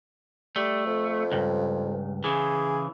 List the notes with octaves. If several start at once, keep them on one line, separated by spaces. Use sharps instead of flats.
G3 A3
F2
C#2 G2
C#3 E3 G#4